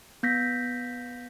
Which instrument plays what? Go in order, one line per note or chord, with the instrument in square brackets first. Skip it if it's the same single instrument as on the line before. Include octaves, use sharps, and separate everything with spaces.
[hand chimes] B3 G6 A#6 B6